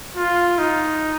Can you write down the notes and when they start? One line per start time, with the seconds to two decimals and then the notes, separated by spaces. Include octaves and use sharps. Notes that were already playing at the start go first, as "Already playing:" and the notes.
0.17 F4
0.59 D#4